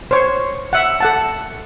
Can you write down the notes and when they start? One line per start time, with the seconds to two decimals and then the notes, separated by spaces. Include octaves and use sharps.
0.11 C5 C#5
0.73 E5 F#5
1.00 A4 F#5 A5